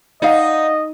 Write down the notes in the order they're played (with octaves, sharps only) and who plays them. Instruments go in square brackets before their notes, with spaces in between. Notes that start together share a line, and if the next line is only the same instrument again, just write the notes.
[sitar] D#4 [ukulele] D5 F5 F#5 [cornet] D#5